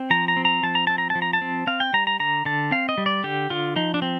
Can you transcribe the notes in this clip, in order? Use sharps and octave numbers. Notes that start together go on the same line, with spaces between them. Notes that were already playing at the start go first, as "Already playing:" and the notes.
Already playing: C4
F3 A#5
A#5
C4
A#5
F3 A5
A#5
C4 A5
A#5
A5
F3
A#5
A5
C4
C4 F5
G5
G3 A#5
A#5
D3 A#5
D3 A5
C4 F5
D#5
G3
D5
D3 G4
D3 F4
F3 D#4
D4
C4